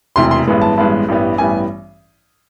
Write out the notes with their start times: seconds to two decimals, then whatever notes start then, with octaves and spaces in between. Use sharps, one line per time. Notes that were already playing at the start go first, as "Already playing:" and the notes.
0.16 E1 D2 C3 E3 C6
0.31 C6
0.47 A1 G2 E3 G#3 B3
0.62 A5
0.77 A1 G2 E3 G#3 B3
1.08 A1 G2 E3 G3 B3
1.38 A1 G2 E3 G3 B3 G#5